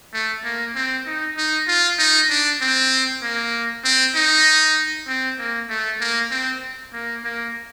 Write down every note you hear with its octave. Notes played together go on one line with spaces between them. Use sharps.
A3
A#3
C4
D#4
D#4
F4
D#4
D4
C4
A#3
C4
D#4
C4
A#3
A3
A#3
C4
A#3
A#3